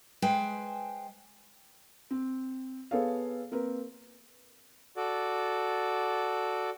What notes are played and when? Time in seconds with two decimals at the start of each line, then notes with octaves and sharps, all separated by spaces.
0.22 G#3 B4 C5 G5 G#5
2.11 C4
2.91 B3 G#4 A4 C#5 F5
3.52 A#3 C4 A#4 B4
4.97 F#4 A4 D5